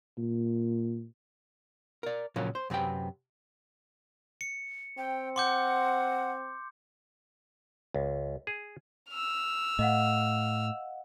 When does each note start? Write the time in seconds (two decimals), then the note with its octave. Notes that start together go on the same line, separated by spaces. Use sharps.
0.18 A#2
2.03 A#4 D5
2.36 A#2 C#3 F3 F#3 A#3
2.55 C5
2.70 F#2 C3 C4 B4 G5
4.41 C#7
4.98 C4 G5
5.36 F#5 C6 D6 G6
7.94 C#2
8.47 G#4
9.09 E6 F6
9.79 A2 D#5 F5 F#5